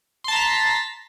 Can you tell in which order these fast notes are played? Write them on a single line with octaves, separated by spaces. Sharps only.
C6 A5 A#5 B6